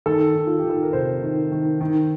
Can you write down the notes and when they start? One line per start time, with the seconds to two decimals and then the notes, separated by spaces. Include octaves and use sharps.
0.06 D#3 A4
0.35 D#3
0.47 F4
0.59 G4
0.64 D#3
0.70 A4
0.83 A#4
0.93 C3 C5
1.23 D#3
1.52 D#3
1.81 D#3